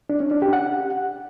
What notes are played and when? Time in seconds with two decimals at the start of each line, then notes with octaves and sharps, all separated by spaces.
0.10 D4
0.20 C#4
0.31 D4
0.42 G4
0.53 F#5